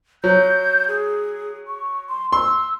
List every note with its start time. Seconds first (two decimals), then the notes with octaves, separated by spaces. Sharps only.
0.24 F#3 G6
0.88 G#4
1.67 C#6
2.09 C6
2.32 C6 E6